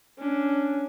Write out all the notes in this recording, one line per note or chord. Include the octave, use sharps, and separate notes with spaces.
C#4 D4